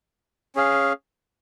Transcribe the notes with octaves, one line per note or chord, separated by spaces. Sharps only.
C#4 G#4 F5